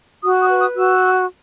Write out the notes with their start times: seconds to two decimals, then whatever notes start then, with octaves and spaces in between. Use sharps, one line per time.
0.23 F#4 D#6
0.41 D#6
0.50 B4
0.60 D#6
0.76 F#4 E6